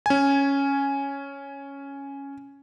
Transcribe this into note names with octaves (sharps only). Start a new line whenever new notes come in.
C#4 G#5